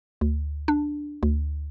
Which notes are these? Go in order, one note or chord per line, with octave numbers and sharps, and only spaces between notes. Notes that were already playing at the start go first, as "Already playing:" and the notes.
D2
D4
D2